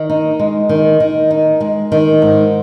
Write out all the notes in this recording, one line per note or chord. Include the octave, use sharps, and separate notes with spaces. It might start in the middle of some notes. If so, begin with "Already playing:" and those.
Already playing: D#3
D#4
G#3
D#3
D#3
D#4
G#3
D#3
G#2